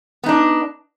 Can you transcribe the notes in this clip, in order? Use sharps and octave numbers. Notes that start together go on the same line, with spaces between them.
B3 D4 D#4